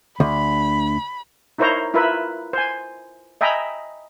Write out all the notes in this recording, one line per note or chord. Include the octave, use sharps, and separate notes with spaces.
D2 B5
D#4 E4 A#4 C5 C#5 A#5
E4 F4 A#4 B4 E5 B5
C5 G#5
D#5 E5 G5 G#5 A#5 B5